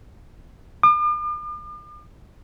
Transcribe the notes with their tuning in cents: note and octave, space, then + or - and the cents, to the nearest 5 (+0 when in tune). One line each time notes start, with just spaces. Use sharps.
D6 +45